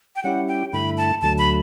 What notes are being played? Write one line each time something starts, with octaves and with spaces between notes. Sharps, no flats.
G5
G3 C#4 E4 G4 F#5
G5
G2 D3 A3 E4 B5
A5
D2 D3 F#3 A3 A5
B5